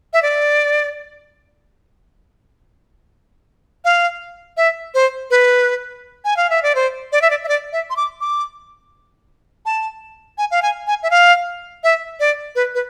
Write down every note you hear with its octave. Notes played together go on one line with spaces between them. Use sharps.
E5
D5
F5
E5
C5
B4
G#5
F5
E5
D5
C5
D5
E5
D5
E5
D5
E5
C6
D6
D6
A5
G#5
F5
G#5
G#5
E5
F5
E5
D5
B4
B4